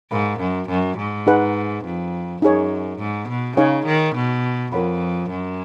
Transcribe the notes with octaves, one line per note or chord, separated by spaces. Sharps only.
G#2 A#4 F5 B5
F#2
F#2
G#2
D#4 G#4 B4 F#5
F2
F#2 D#4 G#4 C#5
G#2
B2
C#3 D#4 G#4 C#5 F5 G#5
D#3
B2
F2 F4 A#4 C#5 F#5 B5
F#2